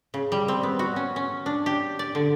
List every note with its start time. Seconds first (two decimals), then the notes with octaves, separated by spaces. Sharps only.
0.14 C#3
0.32 G3
0.48 C4
0.63 B3
0.79 F#4
0.96 C#4
1.16 C#4
1.46 D4
1.66 G4
1.99 D5
2.15 D3